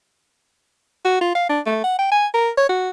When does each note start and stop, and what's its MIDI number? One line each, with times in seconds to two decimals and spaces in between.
1.05 1.18 66
1.21 1.33 65
1.35 1.48 77
1.49 1.60 62
1.66 1.80 57
1.84 1.99 78
1.99 2.07 79
2.12 2.27 80
2.34 2.50 70
2.57 2.67 73
2.69 2.90 66